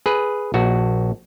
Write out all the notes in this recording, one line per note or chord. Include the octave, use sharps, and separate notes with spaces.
G#4 B4
A#1 F#4